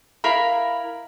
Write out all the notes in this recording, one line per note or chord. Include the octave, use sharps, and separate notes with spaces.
E4 A#4 F5 B5